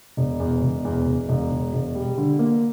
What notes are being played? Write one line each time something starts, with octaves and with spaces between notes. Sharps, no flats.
E1
E2
E1
E2
E1
E1
E1
E1
G3
D3
A#3